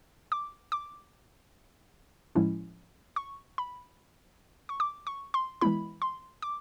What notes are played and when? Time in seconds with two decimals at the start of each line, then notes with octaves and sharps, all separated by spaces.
0.32 D6
0.72 D6
2.35 A2 F3 G#3 C#4 E4
3.16 C#6
3.58 B5
4.69 C#6
4.80 D6
5.07 C#6
5.34 C6
5.61 E3 G#3 B3 E4 B5
6.02 C6
6.42 D6